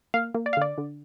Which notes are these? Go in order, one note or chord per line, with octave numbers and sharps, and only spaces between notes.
A#3 F5
A#3
D5
F5
D3 D5
D3